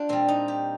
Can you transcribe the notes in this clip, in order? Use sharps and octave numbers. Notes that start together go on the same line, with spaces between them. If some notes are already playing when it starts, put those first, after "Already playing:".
Already playing: D4 F4 G4
A#2 G3 C4
D#4
G4